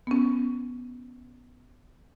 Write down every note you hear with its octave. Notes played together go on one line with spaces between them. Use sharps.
B3 C#4